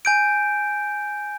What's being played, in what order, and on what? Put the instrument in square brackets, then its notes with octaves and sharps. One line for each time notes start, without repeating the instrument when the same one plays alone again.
[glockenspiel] G#5 G6 D7